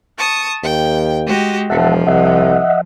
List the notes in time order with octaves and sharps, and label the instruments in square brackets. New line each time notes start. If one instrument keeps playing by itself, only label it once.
[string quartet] A5 C#6 D#6
[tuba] D#2 [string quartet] G5
[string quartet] G#3 F#4 G4
[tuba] E1 [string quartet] F3 [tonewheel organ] E5 F#5 A5
[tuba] C2 [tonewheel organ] D#5 E5 F#5